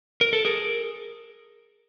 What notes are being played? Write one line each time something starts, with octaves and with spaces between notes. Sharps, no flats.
A#4
A4
G#4 A#4